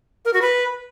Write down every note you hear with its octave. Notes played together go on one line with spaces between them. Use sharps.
A#4
F#4
B4